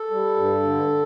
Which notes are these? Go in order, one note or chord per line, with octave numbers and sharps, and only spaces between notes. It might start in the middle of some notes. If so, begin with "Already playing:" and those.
Already playing: A4
G3
G2
D3